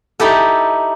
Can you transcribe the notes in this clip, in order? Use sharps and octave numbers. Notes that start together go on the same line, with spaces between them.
D#4 E4 G4 A4